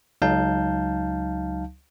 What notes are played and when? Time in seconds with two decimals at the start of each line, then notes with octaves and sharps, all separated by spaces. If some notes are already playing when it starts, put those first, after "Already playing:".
0.22 C#2 F#3 D#4 F5 A5 G6